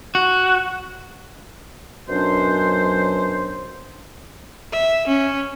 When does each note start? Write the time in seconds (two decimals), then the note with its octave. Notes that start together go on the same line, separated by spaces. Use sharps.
0.15 F#4
2.09 F#2 B2 F#3 C#4 D4 C5
4.73 E5
5.07 C#4